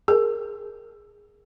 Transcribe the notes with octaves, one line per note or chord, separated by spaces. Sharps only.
G#4 A#4